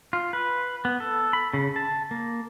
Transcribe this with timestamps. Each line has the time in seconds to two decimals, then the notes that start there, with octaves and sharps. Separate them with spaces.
0.13 F4
0.33 B4
0.85 B3
1.00 A4
1.33 B5
1.54 C#3
1.76 A5
2.11 A#3